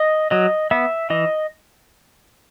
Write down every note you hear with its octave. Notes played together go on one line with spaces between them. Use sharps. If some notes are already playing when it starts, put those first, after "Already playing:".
Already playing: D#5
F#3 D#5
B3 E5
E3 D#5